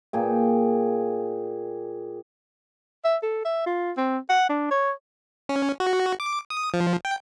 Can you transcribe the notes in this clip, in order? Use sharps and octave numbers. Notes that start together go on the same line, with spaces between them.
A#2 G#4 G5
E5
A4
E5
F4
C4
F#5
D4
C#5
C#4
F#4
D6
D#6
F3
G5